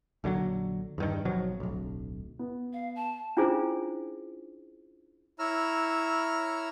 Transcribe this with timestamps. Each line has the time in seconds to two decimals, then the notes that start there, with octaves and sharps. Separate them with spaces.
0.24 A#1 D3 E3 F#3
0.98 E2 G2 D#3
1.25 G#1 B2 F3 F#3
1.60 D1 B1
2.39 B3
2.73 F5
2.96 A5
3.37 C#4 D4 E4 F4 G#4 C5
5.39 E4 C#5 A#5 E6 F6